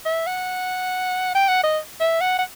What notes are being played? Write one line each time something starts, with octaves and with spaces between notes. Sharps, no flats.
E5
F#5
G5
F#5
D#5
E5
F#5
F#5